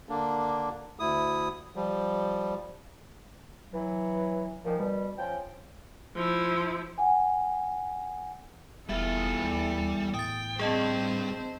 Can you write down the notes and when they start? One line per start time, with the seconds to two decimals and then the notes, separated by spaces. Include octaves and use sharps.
0.09 D3 A#3 D4
1.00 D2 E4 D#6
1.76 F3 G3
3.73 E3 F#3
4.65 A#2 D#3 F3
4.79 B2 G3
5.18 F3 C#4 G5
6.16 F3 E4
6.98 F#5 G#5
8.89 F1 E2 E3 G3 F4 A4 E5
9.44 D#2 G3
10.14 A2 G5 D#6 A6
10.59 G2 C4 G#4 C5 D#5 A5